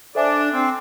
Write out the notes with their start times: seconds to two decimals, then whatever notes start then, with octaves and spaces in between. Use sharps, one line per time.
0.15 D4 A4 C5 E5 G#5 D6
0.53 C4